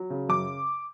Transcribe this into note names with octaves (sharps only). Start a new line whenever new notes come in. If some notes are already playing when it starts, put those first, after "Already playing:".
Already playing: F#3
C#3
F#2 D6